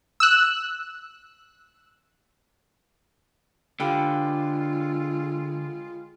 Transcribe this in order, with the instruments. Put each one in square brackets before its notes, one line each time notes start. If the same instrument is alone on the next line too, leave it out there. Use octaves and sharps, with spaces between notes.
[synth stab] E6 F#6
[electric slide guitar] D3 [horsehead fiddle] G#3 F4 [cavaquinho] G4 B4 F5